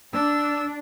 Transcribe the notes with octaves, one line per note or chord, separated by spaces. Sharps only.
D4 E6